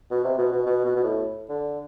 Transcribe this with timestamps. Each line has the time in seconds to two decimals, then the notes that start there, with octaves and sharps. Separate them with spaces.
0.11 B2
0.24 C3
0.38 B2
0.52 B2
0.66 B2
0.85 B2
0.96 B2
1.04 A2
1.49 D3